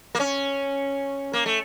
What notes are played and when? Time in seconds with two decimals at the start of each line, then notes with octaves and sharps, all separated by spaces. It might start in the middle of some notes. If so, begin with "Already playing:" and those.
0.15 A#3
0.20 C#4
1.33 A#3
1.46 A3